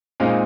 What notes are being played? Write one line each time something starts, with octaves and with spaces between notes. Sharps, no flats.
A#2 G#3 C4 D#4 F5